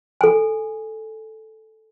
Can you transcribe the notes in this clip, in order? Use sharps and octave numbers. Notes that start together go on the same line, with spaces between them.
A4 G#5